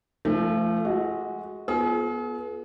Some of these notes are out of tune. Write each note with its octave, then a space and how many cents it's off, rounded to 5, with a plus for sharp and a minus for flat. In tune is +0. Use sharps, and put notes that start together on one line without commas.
F3 -35 A3 +0
G#3 +0 F#4 +0 D#5 +30
B3 -15 F4 +0 G#4 +40